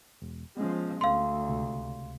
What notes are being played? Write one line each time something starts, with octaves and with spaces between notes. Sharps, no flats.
E1
F3 G#3 B3 C#4
D2 F5 C6
C#2 C3